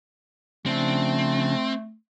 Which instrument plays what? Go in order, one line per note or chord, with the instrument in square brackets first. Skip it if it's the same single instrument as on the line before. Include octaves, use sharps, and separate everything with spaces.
[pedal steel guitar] C#3 F3 D4 [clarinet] A3 [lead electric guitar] C4